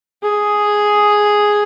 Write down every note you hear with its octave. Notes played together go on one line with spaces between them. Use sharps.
G#4